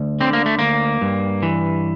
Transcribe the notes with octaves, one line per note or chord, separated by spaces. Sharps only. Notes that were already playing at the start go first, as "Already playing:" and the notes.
Already playing: D2
D3 C4
A#3
A3
D2 A#3
G2
E3